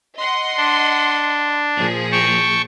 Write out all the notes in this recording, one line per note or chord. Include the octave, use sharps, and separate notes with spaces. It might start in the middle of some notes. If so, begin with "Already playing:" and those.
D#5 F#5 C6
D4
A#2 F3 G#4
G5 A5 C#6